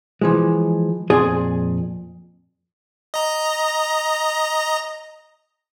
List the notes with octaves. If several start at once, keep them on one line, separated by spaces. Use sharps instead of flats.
E3 F3 G#3
F2 A#2 G#4 D5 G#5 C6
D#5 A#5